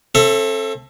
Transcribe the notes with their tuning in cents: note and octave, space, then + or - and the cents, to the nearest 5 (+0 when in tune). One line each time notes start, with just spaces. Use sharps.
C4 +40 A4 +0 E5 +25